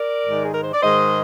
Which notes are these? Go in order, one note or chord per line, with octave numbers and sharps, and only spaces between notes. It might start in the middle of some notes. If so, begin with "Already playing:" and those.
Already playing: A#4 D5
G#2 D#3 G#3
G#4
A#4
C5
D5
G#2 D#3 G#3 C5 D#5